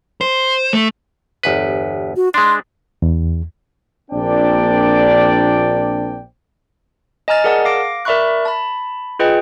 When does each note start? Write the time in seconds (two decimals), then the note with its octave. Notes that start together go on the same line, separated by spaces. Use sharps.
0.21 C5
0.73 A3
1.43 G1 E2 B4
2.16 F#4
2.34 G#3 D4 C6
3.02 E2
4.11 A#1 A#2 C4 D4 D5 G5
7.28 D#5 G#5 A#5 F6 A6
7.44 G#4 A#4 D5 F#5 A5
7.65 F5 D6 A#6 D7
8.05 A#4 D5 E5 B5 C#6 F#6
8.45 A5 B5
9.19 F4 G#4 B4 D#5 G5